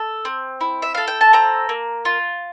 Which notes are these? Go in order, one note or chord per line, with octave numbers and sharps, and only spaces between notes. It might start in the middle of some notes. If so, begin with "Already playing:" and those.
Already playing: A4
C4
E4
E5
A4 F5
G5
A5
C4 A#5
A#3
F4